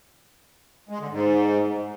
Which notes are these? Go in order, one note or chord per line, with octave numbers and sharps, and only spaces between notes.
G#3
D3
G#2